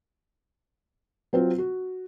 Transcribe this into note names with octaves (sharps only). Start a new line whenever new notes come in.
F#3 C4 F4
F#4